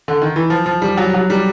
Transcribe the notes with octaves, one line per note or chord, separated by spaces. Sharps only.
D3
D#3
E3
F3
F3
G3
F#3
F#3
G3